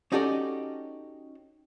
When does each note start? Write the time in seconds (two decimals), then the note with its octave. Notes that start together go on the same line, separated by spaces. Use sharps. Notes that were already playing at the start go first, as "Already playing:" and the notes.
0.12 C#4 D#4 F#4 G4 A4 D5